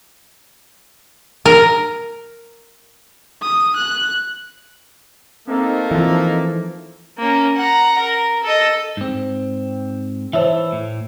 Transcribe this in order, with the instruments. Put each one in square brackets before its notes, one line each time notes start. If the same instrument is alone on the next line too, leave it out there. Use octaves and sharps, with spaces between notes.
[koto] A#4
[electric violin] D#6
F#6
[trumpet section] A3 A#3 [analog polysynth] C4 D#4 A4
[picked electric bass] E3 F3
[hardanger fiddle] A#3 C#4
F#5 A#5
A#4
A4 D#5
[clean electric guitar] G#2 C4
[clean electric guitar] E3 E4 A4 [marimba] C5 C#5 E5
[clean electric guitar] A2